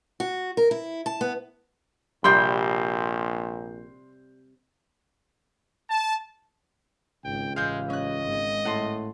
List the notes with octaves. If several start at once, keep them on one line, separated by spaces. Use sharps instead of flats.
F#4
A#4
E4
A5
B3
A#1 C3 G3 G5 C6 G6
A5
G#1 C#2 G5
A1 E3 G#3 F5 F6 G6
C#4 D#5 F#6
G#1 G#3
A2 F#5 A5 C6